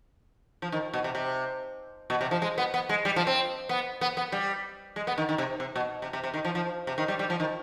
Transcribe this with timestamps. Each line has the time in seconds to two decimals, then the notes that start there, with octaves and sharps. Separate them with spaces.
0.62 F3
0.72 D#3
0.94 B2
1.04 C3
1.15 C3
2.10 B2
2.21 C3
2.31 F3
2.42 G#3
2.58 B3
2.74 B3
2.89 G#3
3.05 G3
3.16 F3
3.27 C4
3.69 B3
4.01 B3
4.17 B3
4.32 G3
4.96 G#3
5.07 B3
5.18 D#3
5.29 D#3
5.38 C3
5.60 C3
5.76 B2
6.02 C3
6.13 C3
6.24 C3
6.34 D#3
6.45 F3
6.55 F3
6.87 C3
6.98 D#3
7.08 G3
7.19 G3
7.30 F3
7.40 D#3